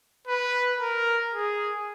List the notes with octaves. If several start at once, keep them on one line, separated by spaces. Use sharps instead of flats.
B4
A#4
G#4